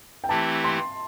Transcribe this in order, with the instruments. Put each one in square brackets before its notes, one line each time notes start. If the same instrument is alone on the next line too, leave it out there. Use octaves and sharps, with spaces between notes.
[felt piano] G5
[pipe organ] E3 A3 C4 E4 G4 [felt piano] A5
[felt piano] C6